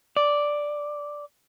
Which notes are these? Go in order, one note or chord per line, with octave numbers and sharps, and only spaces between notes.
D5